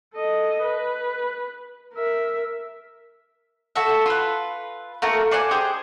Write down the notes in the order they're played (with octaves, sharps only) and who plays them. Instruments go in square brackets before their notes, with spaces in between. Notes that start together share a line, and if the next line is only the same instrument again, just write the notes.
[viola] A4 D#5
B4
A#4 E5
[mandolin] F#4 A4 E5
F4 B4
A3 A#3 F#4 A#4
C5 D5 F#5 G#5
G4 G#4 C5 D#5